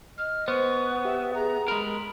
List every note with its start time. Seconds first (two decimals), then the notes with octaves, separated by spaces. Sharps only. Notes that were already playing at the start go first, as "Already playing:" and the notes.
0.18 D#5 F6
0.48 B3 C5 C#6
0.88 F#5
1.05 G4 E5
1.35 G#4 A#5
1.68 G#3 A#4 B5